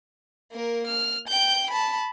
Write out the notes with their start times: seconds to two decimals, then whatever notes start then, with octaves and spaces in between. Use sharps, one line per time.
0.52 A#3 A#4
0.87 F6
1.28 G5 G6
1.71 A5 B5